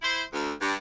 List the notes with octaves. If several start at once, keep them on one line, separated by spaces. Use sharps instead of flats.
E4 C5
D2
G2